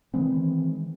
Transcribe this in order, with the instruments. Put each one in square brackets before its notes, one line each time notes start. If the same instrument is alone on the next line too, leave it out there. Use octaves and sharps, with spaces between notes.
[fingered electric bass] D#3 E3 G#3 C4